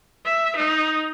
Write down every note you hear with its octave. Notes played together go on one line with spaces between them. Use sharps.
E5
D#4